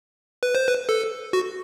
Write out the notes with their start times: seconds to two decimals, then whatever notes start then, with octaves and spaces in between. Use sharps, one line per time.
0.43 B4
0.55 C5
0.68 B4
0.89 A4
1.33 F#4